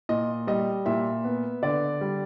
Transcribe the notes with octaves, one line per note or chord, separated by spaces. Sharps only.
A#2 D#5
G3 D#5
A#2 E5
B3
D3 D5
G3